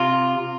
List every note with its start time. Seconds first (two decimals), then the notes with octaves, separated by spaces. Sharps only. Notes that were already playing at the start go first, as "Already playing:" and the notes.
Already playing: C3 F4